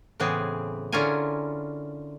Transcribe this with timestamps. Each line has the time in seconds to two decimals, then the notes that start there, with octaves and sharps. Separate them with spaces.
0.20 A2 C#3 E3 B3 C4 G#4
0.92 D3 C#4 E4 F4 A#4 G#5